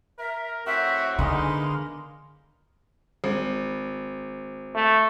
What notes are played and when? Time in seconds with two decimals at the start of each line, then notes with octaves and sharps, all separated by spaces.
0.19 A#4 E5
0.67 A2 C4 F#4 E5
1.19 D3 G#3 A#3 B3 D#4 C6
3.24 G#1
4.75 A3